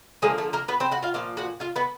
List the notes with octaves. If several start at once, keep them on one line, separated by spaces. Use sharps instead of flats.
D3 F3 G#3 A#3 G#4
A3 A4
A#3 A#4
B3 B4
C4 C5
F#4 F#5
F4 F5
A#2 F3 F5
F#4 F#5
F4 F5
B3 B4